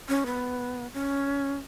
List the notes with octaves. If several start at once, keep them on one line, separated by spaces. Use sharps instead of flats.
C#4
B3
C#4